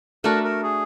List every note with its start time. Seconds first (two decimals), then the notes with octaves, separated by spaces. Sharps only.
0.24 A3 D4 F#4 A4 A#4
0.44 A#4
0.63 G#4